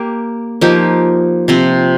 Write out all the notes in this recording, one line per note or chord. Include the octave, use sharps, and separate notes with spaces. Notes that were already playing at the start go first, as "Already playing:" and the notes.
Already playing: A#3 G4
F3 A#3 D#4 G4
C3 F3 C4